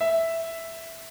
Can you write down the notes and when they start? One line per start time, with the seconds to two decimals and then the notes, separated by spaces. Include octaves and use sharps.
0.01 E5